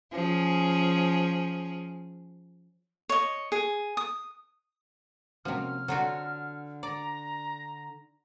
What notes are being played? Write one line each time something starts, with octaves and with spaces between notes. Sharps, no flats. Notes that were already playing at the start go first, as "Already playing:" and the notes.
F3 C#4 G#4
C#5 D#5
G#4
D#6
C3 F3 A#3 C#4 F#4 F6
D3 F#3 D4 F4 F#4
D5 A#5